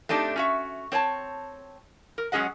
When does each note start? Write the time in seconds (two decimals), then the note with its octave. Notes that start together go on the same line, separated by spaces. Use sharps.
0.09 A3 C4 D4 D#4 G4
0.36 C#4 F#4 E5
0.92 C4 C#5 G#5 A5
2.18 A#4
2.32 F#3 G#3 C#4 G#4 D#5 F#5